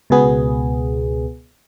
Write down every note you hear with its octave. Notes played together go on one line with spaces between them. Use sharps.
C#2 B2 B3 G#4